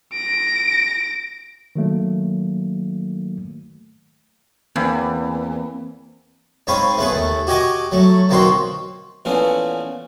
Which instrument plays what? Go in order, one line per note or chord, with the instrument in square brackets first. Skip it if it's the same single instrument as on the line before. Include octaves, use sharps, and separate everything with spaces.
[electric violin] A#6 D7
[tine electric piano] D#3 F#3 A3 A#3
[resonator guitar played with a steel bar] E2 [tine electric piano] A#3 C4
[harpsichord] G#2 C4 C#5 F5 B5 D#6
A3 B3 G#4 B4
D#2 A3
F#4 G4 D#5 G#5 D6 D#6
F#3 A3
B1 D#3 A#3 C4 F#4 C6
A#2 E3 A3 B3 C#4